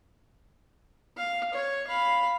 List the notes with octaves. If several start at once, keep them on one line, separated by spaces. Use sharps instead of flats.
F5
C#5
F5 B5